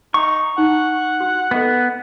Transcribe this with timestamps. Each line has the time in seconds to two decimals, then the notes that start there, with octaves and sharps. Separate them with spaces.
0.14 D#4 F#5 C#6
0.58 D#4 F#5
1.20 F#4
1.51 B3 A4 D#5 A#5